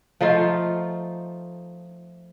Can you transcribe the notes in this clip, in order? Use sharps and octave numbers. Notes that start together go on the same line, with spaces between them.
F3 A3 D#4 F4